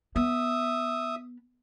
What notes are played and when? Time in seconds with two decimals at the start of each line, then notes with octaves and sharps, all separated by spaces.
0.16 B3 E5 D#6